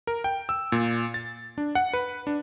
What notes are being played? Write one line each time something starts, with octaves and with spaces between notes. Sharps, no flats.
A#4
G5
E6
A#2
A6
D4
F#5
B4
D4